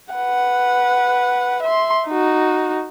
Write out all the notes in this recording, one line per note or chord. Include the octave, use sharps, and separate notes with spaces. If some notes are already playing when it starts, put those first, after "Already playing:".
B4 F#5
E5 C6
D#4 F#4